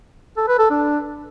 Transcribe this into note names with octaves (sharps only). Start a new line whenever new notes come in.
A4
B4
A4
D4